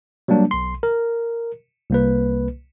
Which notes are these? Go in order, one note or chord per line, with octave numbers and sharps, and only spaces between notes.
F#3 G3 A#3 D4
B1 C6
A#4
C2 A#3 B4